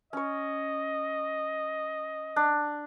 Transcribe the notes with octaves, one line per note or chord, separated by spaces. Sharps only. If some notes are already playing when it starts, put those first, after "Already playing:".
C#4 C#5 D#5
D4